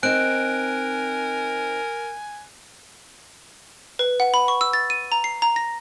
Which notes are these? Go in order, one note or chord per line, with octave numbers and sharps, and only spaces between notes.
C4 D#4 A#4 G#5 F#6 D7
B4
F#5
B5
C#6
E6
A6
D#7
A#5
C7
A#5
A#6